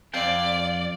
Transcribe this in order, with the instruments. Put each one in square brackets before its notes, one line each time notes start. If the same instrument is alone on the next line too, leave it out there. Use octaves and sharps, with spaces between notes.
[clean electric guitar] F2 F5 G5 [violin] D5